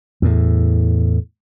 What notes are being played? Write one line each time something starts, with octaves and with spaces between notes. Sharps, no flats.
E2 A2